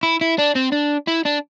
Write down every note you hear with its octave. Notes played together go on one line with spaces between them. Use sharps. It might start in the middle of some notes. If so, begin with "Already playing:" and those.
E4
E4
D4
C4
D4
E4
D4